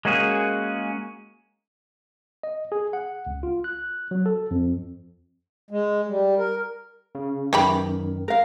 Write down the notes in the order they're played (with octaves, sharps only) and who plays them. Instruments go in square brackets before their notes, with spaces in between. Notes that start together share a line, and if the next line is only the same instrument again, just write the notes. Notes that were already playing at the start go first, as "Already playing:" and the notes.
[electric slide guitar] G#3 A#3 C#4 F#4 G#4
[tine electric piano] D#5
G#4
F#5
C#2
F4
F#6
F#3
A4
F2
[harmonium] G#3
G3
A#4
[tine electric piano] C#3
[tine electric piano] F#2 D#3 [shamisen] E3 G4 B5
[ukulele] A#4 F5 [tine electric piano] A#5